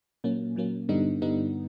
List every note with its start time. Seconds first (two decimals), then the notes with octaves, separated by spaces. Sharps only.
0.24 A#2 F#3 A#3 C#4
0.56 A#2 F#3 A#3 C#4
0.89 G2 D3 G3 B3 D#4
1.22 G2 D3 G3 B3 D#4